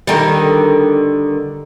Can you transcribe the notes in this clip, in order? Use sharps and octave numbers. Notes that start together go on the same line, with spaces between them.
D3 D#3 G3